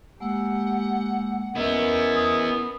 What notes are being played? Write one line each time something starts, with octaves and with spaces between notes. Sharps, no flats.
G#3 A#3 G4 F#5 E6
B3 C#4 E4 A#4 D#5
D#6